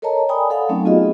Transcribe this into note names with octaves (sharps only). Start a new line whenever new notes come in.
A4 A#4 C#5 D#5 A5 A#5
D5 G5 G#5 B5 D#6
A4 F5 F#5
F#3 A3 C4 C#4 D#4
B3 F4 F#4 G#4 A4 D#5